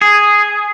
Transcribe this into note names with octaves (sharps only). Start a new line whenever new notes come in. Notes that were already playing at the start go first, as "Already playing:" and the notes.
G#4